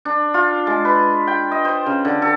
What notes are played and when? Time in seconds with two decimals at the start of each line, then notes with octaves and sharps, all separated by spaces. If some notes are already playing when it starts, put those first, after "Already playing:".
0.05 D4
0.34 F4
0.67 G#3
0.85 B4
1.27 G5
1.52 D#5
1.65 C5
1.86 C#3
2.05 D3
2.22 A4